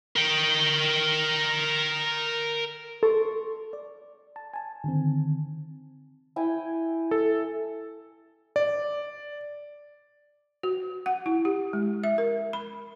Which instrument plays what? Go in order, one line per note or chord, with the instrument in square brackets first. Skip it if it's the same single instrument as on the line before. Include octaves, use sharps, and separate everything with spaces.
[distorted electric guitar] A#4 G5
[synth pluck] A4 [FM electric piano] C6 C#6
[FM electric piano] D5
A5
G#5 A5
D3 D#3 C4
[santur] E4 G5 G#5
[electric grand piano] A4
D5
[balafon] F#4
F#5
E4
G4
G#3
E5
A#4
B5